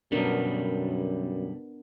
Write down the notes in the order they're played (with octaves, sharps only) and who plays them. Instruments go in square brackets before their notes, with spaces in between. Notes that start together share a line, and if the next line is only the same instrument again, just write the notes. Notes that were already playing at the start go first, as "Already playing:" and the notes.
[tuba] F#2 [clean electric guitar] B2 D3 G3 [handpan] B3 D4 A#4